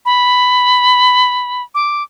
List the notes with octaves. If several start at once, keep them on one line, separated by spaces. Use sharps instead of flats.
B5
D6